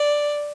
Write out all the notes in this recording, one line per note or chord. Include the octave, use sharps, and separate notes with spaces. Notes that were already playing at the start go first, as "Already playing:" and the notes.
Already playing: D5